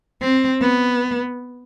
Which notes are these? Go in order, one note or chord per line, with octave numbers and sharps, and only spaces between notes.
C4
B3